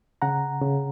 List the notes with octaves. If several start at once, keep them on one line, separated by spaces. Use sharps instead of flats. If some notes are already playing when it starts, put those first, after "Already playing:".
C#3 F#5 A#5
C#3